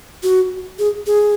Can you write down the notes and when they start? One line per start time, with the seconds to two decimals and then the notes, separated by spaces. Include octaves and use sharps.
0.23 F#4
0.79 G#4
1.06 G#4